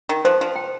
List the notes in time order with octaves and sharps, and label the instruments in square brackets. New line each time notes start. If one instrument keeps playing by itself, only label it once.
[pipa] D#3
[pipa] F3 [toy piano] C5
[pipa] F3
[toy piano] G5